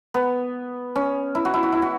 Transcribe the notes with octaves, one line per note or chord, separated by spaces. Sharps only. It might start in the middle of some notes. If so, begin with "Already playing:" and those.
B3
C#4
E4
F#4
E4
F#4
E4
F#4